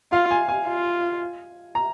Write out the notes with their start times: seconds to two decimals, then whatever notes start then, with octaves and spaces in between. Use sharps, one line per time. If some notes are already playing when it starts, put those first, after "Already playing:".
0.12 F4 F5
0.31 G#5
0.48 G#5
0.67 F4
1.75 A#5